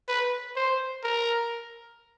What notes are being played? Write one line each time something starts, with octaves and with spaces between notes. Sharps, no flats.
B4
C5
A#4